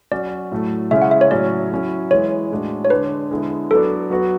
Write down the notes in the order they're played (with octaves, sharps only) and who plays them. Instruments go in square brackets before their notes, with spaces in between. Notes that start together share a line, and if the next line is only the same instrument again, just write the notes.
[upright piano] F#3 C#4 F#4 [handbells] D5
[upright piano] A2 F#3 A3
[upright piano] C#3 G#3 C#4 E4 [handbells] E5
[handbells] F#5
E5
C#5
[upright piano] A2 F#3 C#4 [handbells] D5
[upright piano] F#3 C#4 E4
[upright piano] E3 G#3 B3 E4 [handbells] C#5
[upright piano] A2 G#3 D4 F#4
[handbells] C#5
[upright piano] D3 G#3 D4 [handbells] B4
[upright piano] D3 G#3 B3 E4
[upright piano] F#3 B3 D4 [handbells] A4
[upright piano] F#3 B3 F#4